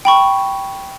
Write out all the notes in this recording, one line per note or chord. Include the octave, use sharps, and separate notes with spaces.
G5 B5 C#6